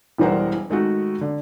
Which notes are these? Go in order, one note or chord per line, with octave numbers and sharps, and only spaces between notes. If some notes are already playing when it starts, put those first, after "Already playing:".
E1 E3 G3 A#4 C5 F#5
D#3 G#3 A3 F#4
D3